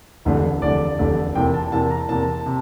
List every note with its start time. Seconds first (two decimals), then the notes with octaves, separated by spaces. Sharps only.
0.25 F1 E2 D3 A3
0.62 F1 E2 D3 A3 D5
0.99 F1 E2 D3 A3
1.35 E2 C3 E3 A#3 G5
1.54 A5
1.72 E2 C3 E3 A#3 A5
1.91 A#5
2.09 E2 C3 E3 A#3 A5
2.46 C3